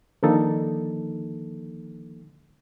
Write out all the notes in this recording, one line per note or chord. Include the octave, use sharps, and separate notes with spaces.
D3 D#3 F3 A#3 D#4 A4